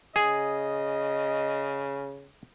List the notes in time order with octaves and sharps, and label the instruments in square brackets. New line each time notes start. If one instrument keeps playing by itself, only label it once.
[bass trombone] C#3 [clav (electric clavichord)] G#4 [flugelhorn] D#5